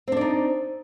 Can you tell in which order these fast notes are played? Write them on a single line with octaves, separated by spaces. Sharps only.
C4 D4 D5 D#4